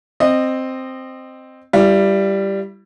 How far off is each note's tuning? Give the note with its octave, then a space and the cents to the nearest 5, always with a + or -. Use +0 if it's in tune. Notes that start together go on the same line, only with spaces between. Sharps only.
C4 +0 D#5 -20
G3 +0 E4 +40